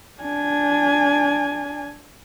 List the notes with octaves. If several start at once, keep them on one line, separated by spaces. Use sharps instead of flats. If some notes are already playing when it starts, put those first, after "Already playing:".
D4 G#5